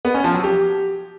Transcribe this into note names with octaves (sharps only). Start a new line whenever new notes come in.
B3
C#4
F3
F#3
G4